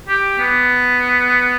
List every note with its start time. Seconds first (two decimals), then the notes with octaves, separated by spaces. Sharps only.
0.08 G4
0.39 B3